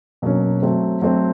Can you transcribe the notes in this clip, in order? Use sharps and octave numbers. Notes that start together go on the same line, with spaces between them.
B2 F#3 A#3 C#4
F#3 A3 C4
F#3 A3 C4